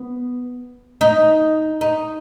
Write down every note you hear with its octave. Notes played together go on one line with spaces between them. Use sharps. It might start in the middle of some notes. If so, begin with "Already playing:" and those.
Already playing: B3
D#4
D#4